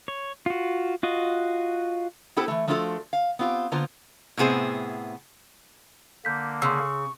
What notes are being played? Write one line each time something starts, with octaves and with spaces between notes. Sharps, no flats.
C#5
F4 F#4
F4 F#4 D#5
B3 E4 G4 A4 C5
E3 A3
F3 A3 D4 F4 F#4 A4
F5
B3 C4 F4 G4
D3 A#3 B3 F4 C5
A2 C3 B3 G#4 C5
D3 A#3 G6 B6
C#3 C6 C#6 E6